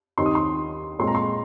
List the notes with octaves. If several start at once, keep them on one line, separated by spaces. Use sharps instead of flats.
D#2 D#3 C4 D#4 C6
D#6
C6
A#2 G#3 C4 C6
A#5
C6